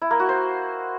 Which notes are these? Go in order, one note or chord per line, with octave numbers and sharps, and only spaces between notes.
E4
A#3
F#4
C5